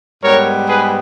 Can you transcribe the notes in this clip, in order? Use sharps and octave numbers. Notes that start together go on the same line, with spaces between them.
G#2 G3 B3 A#4 C#5
G#4 B4